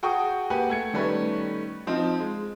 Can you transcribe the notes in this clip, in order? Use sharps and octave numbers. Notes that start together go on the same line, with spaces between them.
F#4 G#4 G5 A5 C#6 D#6
A#3 G4 B4 F#5 G#5
A3 G#6 C#7
D#3 G3 A3 C#4 B4
F3 C4 D#4 F4
G#3